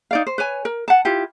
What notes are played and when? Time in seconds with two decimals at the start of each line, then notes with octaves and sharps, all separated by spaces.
0.11 D#4 D5 F5
0.27 C5
0.38 B4 C#5 G#5
0.65 A#4
0.88 F#5 A5
1.05 E4 F4 G4